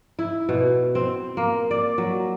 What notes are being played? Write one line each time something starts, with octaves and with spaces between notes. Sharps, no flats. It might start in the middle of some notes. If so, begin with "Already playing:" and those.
E4
B2
C4
A#3
D5
F#3